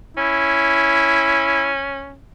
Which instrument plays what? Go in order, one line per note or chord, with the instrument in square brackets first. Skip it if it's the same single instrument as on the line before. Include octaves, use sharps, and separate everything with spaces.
[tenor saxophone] C#4 [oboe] E4